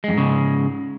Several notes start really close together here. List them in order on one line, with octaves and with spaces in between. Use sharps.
G#3 F2 G#2 C#3